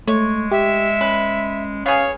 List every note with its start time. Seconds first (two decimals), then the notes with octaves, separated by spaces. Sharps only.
0.08 G#3 A3 C#5
0.51 G4 E5
1.01 C#4 B4
1.86 B3 G#4 C#5 F5